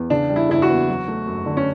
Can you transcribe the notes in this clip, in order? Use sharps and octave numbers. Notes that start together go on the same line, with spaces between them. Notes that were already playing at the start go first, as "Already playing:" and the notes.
Already playing: E2
C#3 D4
G3
E4
F#1 E4
F#4
E2
F#3
A3
F#2
D3
C#4